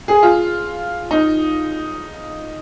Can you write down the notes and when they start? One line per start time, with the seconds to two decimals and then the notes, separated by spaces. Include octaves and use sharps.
0.08 G#4
0.23 F4
1.11 D#4